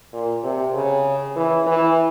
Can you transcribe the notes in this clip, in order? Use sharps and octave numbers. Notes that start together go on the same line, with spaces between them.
A#2
C3
C#3
E3
E3